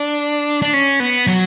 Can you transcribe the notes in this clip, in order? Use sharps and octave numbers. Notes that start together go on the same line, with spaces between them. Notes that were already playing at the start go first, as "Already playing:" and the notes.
Already playing: D4
D4
C#4
B3
F#3